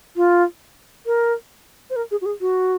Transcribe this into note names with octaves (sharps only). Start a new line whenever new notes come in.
F4
A#4
C5
A#4
G#4
F#4
G#4
F#4